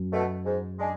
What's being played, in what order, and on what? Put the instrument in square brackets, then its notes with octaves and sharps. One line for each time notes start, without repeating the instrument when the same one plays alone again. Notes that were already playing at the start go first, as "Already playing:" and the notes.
Already playing: [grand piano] F#2
[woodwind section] B2 A3
G#2
G#3 D4 G#4